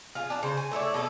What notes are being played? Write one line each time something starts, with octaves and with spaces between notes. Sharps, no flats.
F4 G#4
D4 A5
C#3 C5
G#5
A3 E4 C#5 D5
B2 G#4 A4